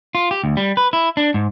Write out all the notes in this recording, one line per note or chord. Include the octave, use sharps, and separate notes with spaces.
F4
G4
D2
G3
B4
E4
D4
G#2